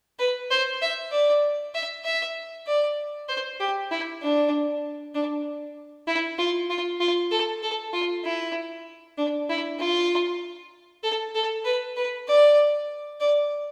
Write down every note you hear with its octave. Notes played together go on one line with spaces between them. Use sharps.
B4
C5
E5
D5
E5
E5
D5
C5
G4
E4
D4
D4
E4
F4
F4
F4
A4
A4
F4
E4
D4
E4
F4
A4
A4
B4
B4
D5
D5